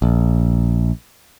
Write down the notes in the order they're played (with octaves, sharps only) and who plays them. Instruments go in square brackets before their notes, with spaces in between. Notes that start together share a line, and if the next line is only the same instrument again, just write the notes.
[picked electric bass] A#1